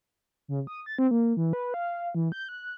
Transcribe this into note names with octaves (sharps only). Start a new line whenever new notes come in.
C#3
D#6
A6
C4
A#3
E3
B4
F5
E3
G6
F#6